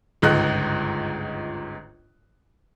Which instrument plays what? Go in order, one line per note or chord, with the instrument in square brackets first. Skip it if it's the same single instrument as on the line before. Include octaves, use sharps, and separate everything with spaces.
[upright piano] G1 C#2 G#2 D#5 F#6